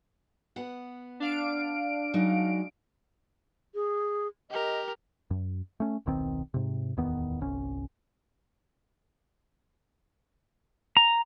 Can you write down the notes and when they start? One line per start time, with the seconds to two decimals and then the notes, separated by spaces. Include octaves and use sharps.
0.56 B3 F#5
1.20 D4 F5 D7
2.14 F#3 G#3 D#4
3.75 G#4
4.50 G4 A#4 D#5
5.31 F#2
5.80 A3 C#4
6.06 D#1 B1 D#3 C4
6.54 G#2 C3
6.97 D1 E2 D#3 B3
7.41 G1 C2 C#4
10.97 A#5